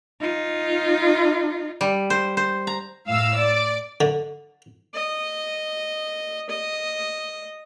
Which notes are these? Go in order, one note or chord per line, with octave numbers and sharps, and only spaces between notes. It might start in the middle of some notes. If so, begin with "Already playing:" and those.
D#4 F4
G3
C5
C5
A#5
A2 F5 E6
D5
D3
D#5
D#5